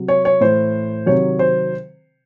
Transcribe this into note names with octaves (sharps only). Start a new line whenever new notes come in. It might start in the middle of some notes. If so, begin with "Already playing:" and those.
Already playing: C3 F#3
C#5
C#5
A2 E3 C5
C3 D#3 F#3 C#5
C5